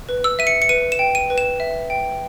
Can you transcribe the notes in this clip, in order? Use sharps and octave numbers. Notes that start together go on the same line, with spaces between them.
B4
E6
E5 D#7
C#7
C#7
B4 D#7
E7
G5
D#7
B4
E7
E5
G5